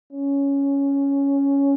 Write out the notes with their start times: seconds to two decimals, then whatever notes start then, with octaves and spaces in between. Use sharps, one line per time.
0.13 C#4